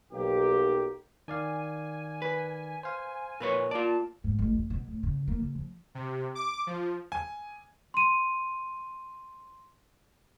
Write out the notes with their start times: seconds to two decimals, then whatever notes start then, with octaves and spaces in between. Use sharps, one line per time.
0.13 B1 A#3 G4
1.28 D#3 D5 F5 G#5
2.22 B4
2.83 C5 F5
3.40 A#2 A#3 B4 C#5
3.71 F4 D5 A5
4.24 G#2
4.39 A1
4.54 F#2
4.70 B2
4.88 A2
5.03 C#3
5.28 A#3
5.40 C#3
5.55 F3
5.95 C3
6.35 D6
6.67 F3
7.12 G#5
7.94 C6 D#7